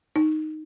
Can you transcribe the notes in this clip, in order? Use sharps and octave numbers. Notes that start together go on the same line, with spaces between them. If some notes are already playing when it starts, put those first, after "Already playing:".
D#4